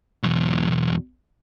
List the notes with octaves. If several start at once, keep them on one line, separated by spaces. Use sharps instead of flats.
B1 E2